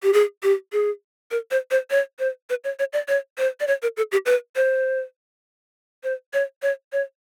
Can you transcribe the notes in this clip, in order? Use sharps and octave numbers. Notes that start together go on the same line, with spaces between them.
G4
G#4
G4
G#4
A#4
C5
C5
C#5
C5
B4
C#5
C#5
D5
C#5
C5
D5
C#5
A#4
A4
G4
B4
C5
C5
C#5
C#5
C#5